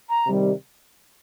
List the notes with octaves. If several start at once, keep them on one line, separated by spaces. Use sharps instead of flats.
A#5
C3 D#3 G3